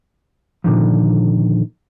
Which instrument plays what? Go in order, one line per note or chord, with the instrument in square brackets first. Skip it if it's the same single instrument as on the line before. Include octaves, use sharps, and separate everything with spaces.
[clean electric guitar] A#2 D3 D#3 F3